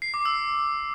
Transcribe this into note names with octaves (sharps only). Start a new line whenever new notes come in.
C7
D6
E6